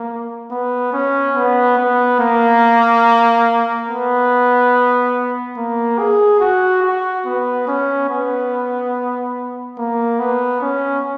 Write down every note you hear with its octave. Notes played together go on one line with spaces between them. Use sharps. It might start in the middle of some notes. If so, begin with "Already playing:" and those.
Already playing: A#3
B3
C#4
B3
B3
A#3
B3
A#3
G#4
F#4
F#4
B3
C#4
B3
A#3
B3
C#4